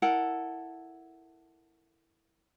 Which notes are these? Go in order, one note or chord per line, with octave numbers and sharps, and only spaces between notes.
E4 A4 A#4 F#5